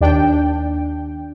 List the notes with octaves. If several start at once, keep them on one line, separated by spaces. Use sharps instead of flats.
D#2 D4 G5